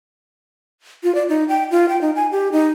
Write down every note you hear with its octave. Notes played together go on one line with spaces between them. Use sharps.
F4
D5
D#4
G5
F4
G5
D#4
G#5
G4
D#4